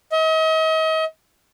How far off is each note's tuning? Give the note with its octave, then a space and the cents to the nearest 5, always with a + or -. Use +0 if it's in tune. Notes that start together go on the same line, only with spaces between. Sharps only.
D#5 +40